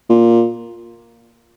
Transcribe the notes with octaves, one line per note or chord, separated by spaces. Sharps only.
A#2